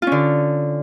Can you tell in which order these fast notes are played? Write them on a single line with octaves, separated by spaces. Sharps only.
F4 C#4 D3